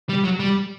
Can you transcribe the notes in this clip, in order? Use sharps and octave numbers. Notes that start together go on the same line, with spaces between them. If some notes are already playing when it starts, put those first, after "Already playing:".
G3
F#3
G3